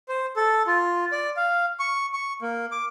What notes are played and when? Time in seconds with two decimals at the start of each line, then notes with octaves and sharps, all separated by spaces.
0.09 C5
0.36 A4
0.67 F4
1.12 D5
1.37 F5
1.79 C#6
2.14 C#6
2.42 A#3
2.72 D6